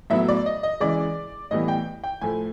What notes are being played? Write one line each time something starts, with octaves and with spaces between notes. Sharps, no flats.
A2 F#3 B3 E5
D5
D#5
D#5
C#3 E3 G#3 D5
A2 E3 G3 B3 D#5
G5
G5
A2 F3 A3 G#5